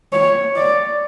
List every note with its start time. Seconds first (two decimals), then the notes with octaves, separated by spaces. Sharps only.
0.12 C#5
0.56 D5